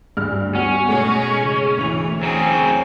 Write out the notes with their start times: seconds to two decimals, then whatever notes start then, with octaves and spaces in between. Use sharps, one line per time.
0.17 D2 G2 F6
0.55 B3 C#4 F#4
0.89 B2 G#3 A3 G#4
1.43 C#3
1.77 D2 E3 F7
2.23 F#3 C4 C#4 G#4